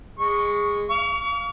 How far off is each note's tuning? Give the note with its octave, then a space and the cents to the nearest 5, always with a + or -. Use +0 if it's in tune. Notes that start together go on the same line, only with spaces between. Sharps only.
G#3 -15 C#6 +0
F5 +0 C#6 +40